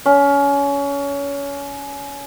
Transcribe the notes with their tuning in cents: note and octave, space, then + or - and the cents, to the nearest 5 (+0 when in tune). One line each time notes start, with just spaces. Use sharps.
C#4 +25